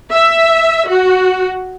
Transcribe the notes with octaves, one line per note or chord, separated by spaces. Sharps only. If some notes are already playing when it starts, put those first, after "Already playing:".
E5
F#4